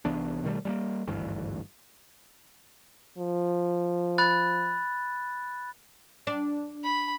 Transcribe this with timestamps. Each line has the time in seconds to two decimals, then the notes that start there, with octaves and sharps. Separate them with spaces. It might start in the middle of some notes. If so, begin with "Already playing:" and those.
0.05 C2 E3 B3 D4
0.44 B2 D#3 G3 A3
0.65 G3 G#3 A#3
1.08 G#1 D2 G2 E3
3.18 F3
4.18 B5 F#6 A6
6.27 D4
6.84 B5